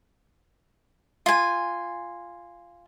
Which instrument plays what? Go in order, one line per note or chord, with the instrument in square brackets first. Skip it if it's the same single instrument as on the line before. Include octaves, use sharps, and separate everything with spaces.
[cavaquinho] F4 G#5